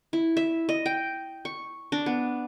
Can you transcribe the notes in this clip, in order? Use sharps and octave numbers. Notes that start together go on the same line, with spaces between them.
E4
E5
D#5
G5
C#6
D4
B3